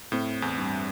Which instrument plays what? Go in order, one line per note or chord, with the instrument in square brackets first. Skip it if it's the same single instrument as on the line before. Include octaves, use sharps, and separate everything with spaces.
[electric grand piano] A2 [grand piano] C4
[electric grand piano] E2
[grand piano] G2